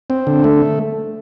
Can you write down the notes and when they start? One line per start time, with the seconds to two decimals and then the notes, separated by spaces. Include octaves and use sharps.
0.10 C4
0.27 D3
0.44 A3